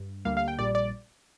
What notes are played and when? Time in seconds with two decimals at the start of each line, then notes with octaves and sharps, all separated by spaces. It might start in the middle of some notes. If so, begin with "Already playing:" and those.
Already playing: G2
0.25 D2 D3 G3 A#3 F5
0.37 F5
0.48 G5
0.59 A#1 A#2 G3 D5
0.75 D5